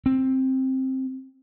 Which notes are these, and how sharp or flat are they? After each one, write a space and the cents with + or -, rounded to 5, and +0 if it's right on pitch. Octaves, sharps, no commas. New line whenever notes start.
C4 +10